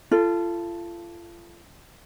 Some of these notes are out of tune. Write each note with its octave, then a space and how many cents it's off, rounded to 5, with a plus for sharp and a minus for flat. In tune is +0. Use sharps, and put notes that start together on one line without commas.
F4 -35 A4 +0